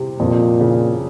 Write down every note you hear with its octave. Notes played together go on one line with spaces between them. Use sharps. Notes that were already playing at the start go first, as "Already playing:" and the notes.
Already playing: C3
F2 A#2
C#3